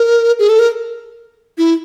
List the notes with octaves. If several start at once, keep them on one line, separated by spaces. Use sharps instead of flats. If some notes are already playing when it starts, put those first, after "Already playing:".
Already playing: A#4
G#4
A4
A#4
E4